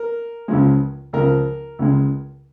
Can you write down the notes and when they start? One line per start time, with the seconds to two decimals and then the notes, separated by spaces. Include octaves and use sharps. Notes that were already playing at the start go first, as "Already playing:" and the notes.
Already playing: A#4
0.48 C#2 C#3 F3 G#3
1.13 C#2 C#3 F3 A#4
1.79 C#2 C#3 G#3